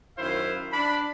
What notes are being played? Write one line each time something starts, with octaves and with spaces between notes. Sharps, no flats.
F#2 D#3 E4 C5 F5
D4 B5